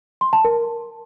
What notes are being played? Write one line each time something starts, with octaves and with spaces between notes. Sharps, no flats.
C6
A5
A#4